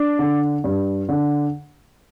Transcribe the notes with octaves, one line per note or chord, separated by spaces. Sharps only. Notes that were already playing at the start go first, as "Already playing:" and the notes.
Already playing: D4
D3
G2
D3